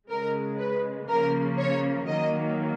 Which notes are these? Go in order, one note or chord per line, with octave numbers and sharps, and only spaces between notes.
C#3 G#3 A#4
B4
C#3 F3 A#3 A#4
C#5
D#3 F#3 A#3 D#5